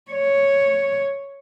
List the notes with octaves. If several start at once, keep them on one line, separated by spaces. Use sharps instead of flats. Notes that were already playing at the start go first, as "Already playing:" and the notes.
C#5